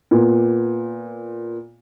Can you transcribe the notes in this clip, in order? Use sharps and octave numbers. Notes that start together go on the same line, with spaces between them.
A#2 B3